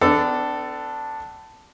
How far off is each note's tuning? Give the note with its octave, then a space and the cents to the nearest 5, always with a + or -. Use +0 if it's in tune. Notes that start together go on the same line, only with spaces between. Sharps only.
B3 +45 D4 +0 A4 +5